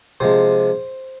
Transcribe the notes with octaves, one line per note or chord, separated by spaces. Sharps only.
C3 F3 G#3 C5